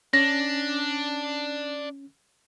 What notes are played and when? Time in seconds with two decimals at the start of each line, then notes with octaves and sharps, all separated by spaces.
0.13 C#4 D4 A#6